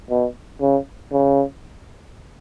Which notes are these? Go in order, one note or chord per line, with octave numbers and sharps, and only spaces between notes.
B2
C#3
C#3